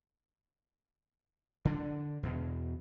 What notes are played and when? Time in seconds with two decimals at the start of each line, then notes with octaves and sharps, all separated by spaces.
1.65 D3 D4
2.23 E2 B2